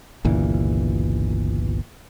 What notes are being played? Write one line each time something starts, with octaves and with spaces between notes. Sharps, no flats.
G1 C#2 A#2 E3